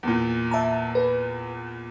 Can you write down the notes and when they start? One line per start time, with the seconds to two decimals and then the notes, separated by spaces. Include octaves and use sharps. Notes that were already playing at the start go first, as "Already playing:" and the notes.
0.03 E2 A#2
0.51 E5 A5 A#5
0.95 B4